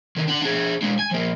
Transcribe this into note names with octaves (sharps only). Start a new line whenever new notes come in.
D3 D#3
D4 F#5
D4 G#4
G#3 D4
G#5
F3 A#3